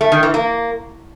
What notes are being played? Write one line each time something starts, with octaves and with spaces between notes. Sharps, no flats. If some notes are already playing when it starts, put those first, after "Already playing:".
A3
D#3
E3
A#3